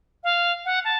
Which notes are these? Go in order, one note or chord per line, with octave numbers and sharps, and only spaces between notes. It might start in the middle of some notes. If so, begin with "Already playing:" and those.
F5
F#5
A5